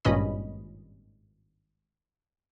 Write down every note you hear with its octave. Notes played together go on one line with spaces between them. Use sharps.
G#1 G2 A#2 C#4 D#5 B5